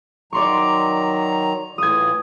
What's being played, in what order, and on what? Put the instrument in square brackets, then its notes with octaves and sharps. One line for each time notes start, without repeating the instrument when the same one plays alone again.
[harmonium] D#3 F#3 A#5 [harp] D5 C6 C#6
[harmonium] A2 E3 F4 [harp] D#6 G#6